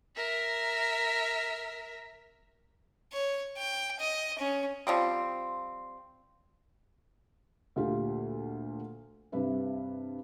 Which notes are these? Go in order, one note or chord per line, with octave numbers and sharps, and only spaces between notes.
A#4 E5
C#5
G5
D#5
C#4
F3 G3 C4
D2 A#2 F4 G4
G2 C3 B4 E5